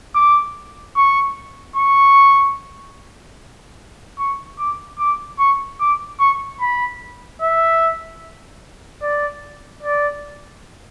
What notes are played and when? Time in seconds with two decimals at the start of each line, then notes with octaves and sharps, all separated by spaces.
0.14 D6
0.96 C#6
1.76 C#6
4.18 C#6
4.59 D6
4.99 D6
5.39 C#6
5.80 D6
6.20 C#6
6.61 B5
7.42 E5
9.02 D5
9.83 D5